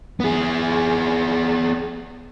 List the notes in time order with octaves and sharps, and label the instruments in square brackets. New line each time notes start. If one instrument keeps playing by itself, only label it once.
[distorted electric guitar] B3 G#4